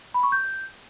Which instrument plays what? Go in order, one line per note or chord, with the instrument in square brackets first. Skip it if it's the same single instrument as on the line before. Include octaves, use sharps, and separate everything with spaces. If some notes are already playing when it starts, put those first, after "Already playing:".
[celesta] B5
C#6
G6